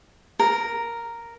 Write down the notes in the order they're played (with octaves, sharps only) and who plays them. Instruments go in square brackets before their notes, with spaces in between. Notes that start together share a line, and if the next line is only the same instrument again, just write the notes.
[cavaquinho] A#4